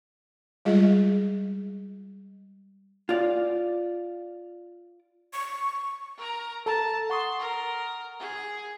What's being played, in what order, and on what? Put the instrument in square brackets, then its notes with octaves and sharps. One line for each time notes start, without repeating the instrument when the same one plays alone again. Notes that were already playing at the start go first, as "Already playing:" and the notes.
[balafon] G3 G#3 F4 G#4 D#5
[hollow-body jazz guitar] F4 D5
[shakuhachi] C#6
[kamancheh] A#4 A#5
[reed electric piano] A4 A#5 [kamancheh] A5
[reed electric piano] F#5 C#6 D#6 [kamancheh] C6
[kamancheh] A#4
G#4